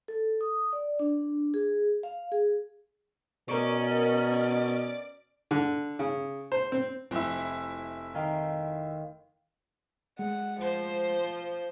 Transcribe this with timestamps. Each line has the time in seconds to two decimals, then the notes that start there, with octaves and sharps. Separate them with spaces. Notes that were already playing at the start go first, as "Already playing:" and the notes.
0.08 A4
0.41 D#6
0.73 D5
0.99 D4
1.54 G#4
2.03 F5
2.32 G#4
3.49 B2 C#4 A#4 D5 D#5 A#5 C#6
5.51 D3
5.99 C#3
6.52 C5
6.72 C4
7.11 F1 C4 E4
8.15 D#3 F5 G5
10.19 G#3 F#5
10.62 F3 C5